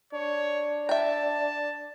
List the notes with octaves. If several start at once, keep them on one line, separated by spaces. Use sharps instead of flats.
D4 C#5
E5 G5 A5